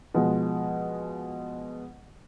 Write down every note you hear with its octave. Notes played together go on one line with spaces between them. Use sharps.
B2 F3 G#3